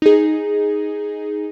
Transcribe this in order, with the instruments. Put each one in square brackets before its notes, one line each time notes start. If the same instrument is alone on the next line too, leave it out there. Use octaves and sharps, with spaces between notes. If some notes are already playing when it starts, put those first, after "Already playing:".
[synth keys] D#4 G#4